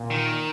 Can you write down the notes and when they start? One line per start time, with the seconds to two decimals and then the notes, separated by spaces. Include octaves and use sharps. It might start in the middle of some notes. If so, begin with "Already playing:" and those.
Already playing: A#2
0.11 D#3